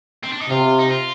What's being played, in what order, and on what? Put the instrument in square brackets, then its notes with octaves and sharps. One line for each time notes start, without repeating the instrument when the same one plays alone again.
[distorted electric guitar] C4
D4
D#4
[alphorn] C3 [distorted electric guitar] F4
[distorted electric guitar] D#4
F4